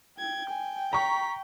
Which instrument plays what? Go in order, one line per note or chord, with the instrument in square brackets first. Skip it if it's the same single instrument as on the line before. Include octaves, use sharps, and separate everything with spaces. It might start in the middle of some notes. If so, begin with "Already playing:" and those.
[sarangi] G5 [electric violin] G#6
[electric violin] G#5
[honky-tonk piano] A#5 C#6 [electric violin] B6